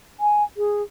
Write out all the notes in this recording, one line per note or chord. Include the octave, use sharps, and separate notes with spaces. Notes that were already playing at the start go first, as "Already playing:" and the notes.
G#5
G#4